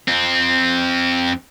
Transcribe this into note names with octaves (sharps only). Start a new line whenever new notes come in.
F2 C4